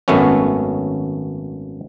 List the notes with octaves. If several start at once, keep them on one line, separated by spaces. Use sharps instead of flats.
G#1 F#2 A3 B3 C#4